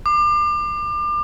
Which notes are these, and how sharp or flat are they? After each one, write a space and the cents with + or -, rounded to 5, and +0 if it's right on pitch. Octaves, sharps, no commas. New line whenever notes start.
D6 +30